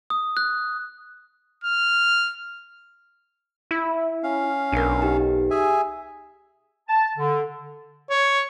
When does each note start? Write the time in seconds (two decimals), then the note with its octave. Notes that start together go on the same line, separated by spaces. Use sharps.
0.10 D#6
0.37 F#6
1.64 F6
3.71 E4
4.23 C#4 F5
4.72 B1 D4 A#4
5.02 D#4 G4
5.51 G#4 E5 G#5
6.89 A5
7.17 D3
8.10 C#5